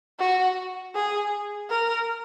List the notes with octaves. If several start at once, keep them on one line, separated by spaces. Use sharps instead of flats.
F#4
G#4
A#4